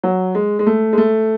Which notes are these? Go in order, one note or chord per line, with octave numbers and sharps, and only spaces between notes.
F#3
G#3
G#3
A3
G#3
A3